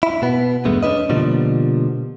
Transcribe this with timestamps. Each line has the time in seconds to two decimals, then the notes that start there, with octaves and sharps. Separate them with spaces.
0.03 E4
0.22 B2 B3
0.65 E2 G2 G#3 A3 B3
0.83 C#4 D4 E4 B4 D#5
1.09 B2 D3 F3 G3 A#3